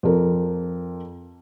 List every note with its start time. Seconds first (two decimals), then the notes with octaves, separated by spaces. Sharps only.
0.03 F2 A#4